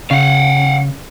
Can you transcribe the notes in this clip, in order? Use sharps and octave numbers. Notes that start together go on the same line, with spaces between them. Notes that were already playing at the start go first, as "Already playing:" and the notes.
C#3 F5 F#5